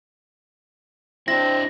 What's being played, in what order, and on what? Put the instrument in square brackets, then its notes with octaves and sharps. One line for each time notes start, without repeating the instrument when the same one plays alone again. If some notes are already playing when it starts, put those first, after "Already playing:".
[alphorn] C4 [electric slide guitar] D4 E4 [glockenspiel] A#6